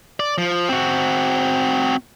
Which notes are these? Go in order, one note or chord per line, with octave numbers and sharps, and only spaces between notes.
D5
F3
C4 F#4